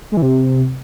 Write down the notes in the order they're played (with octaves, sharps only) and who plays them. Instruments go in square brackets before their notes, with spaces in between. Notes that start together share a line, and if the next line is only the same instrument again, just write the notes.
[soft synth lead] G#3
E3
C3